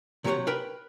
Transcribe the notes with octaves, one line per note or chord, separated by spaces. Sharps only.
C3 F#3 G4 A#4 C#5 F#5
A#4 B4 G5 B5